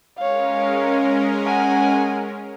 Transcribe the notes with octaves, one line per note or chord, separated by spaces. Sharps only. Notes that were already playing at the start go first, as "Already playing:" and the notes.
G#3 C#4 A#4 C#5 F5
F#5 G#5